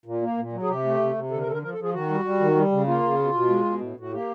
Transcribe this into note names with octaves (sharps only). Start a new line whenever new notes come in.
A#2
A#3
A#2
F#3
G#4
C3 G4
A3
C3
C3
D3 A4
A#4
D3 A4 A#4
F3 A#4
A4
F3
G#4
D#3 F#4
G3
G3
D#3
G3
C#3
A#3 F4
C#3
B2
B2
G#3
B2
A2
A2 F#4
A#3 G4